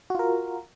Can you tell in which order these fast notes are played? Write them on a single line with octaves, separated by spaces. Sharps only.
F#4 F4 A#4